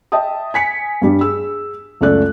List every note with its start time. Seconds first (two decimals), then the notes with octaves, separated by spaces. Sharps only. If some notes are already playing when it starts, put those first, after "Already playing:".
0.12 D#5 E5 G5 A5 D#6
0.54 G#5 B6 C#7
1.02 G2 G3 D4
1.21 G#4 E6
2.01 C#2 F#2 A3 D5 F#6